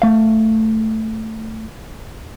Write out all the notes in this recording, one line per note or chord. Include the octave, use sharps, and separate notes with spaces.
A3 F5